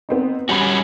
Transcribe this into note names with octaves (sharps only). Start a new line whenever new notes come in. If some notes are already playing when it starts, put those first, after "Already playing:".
B3 C4 D#4
G3 C#4 F#4 G#5 B5